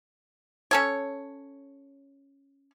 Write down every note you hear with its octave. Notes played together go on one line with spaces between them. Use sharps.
C#4 A4 C#5